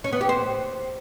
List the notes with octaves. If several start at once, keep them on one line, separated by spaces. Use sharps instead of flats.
C#4
B3
G4
C5